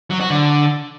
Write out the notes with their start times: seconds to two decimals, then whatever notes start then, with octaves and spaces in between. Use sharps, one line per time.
0.11 F#3
0.20 F#4
0.30 D3